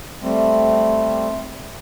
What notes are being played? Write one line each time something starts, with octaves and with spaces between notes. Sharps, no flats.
G3 A3 C4